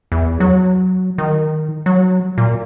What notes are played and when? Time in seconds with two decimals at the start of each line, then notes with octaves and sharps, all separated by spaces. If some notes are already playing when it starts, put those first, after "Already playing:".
0.12 E2
0.40 F#3
1.18 D#3
1.86 F#3
2.38 A#2